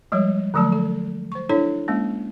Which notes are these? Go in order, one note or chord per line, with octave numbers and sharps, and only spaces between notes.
F3 G3 G#3 C#5
D3 F3 F#3 A3 A5
A4
C5 C#6
D4 E4 A4 C#5
G#3 A#3 C#4